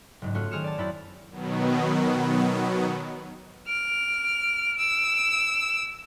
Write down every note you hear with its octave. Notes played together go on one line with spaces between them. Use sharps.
F#1 G#2
A3 C#4 F4 F#4
D#3 C4 G#4 F6 C#7 E7
D5 A5
F#2 C4 E4 B5 A6
B2 D#3 F#3 B3
F6 D7
E6